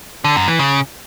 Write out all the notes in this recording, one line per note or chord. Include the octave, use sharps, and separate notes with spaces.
D3
F#2
E3
C#3